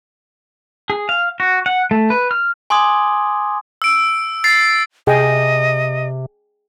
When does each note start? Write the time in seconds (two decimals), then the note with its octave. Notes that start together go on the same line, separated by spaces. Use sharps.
0.90 G#4
1.09 F5
1.40 F#4
1.66 F#5
1.91 A3
2.10 B4
2.31 F6
2.70 G#5 C6 D6 D#6 G#6
3.82 E6 D7
4.44 A6 C7
5.07 C3 G#4 D#5 G5